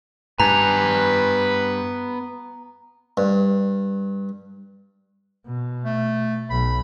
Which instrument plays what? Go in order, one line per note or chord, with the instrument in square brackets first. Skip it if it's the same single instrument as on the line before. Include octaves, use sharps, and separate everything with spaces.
[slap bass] G2 [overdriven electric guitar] B3 G#5 [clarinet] B4 [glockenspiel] A#5
[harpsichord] G2
[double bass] B2
[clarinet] A3
[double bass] B1 [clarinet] B5